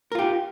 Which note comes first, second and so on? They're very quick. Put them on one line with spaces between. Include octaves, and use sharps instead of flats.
A#4 F4 G4